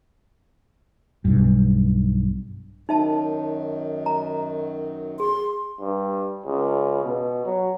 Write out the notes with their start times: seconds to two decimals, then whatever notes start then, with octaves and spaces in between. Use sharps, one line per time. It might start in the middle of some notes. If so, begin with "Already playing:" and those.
1.25 B1 G2
2.89 F#2 D#3 F#3 D#4 E5 A5
4.06 A#5
5.20 G#4 C6
5.79 G2
6.45 C#2
7.04 B2
7.45 F#3